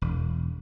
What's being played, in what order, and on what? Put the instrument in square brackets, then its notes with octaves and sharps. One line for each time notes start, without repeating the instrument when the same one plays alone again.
[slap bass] E1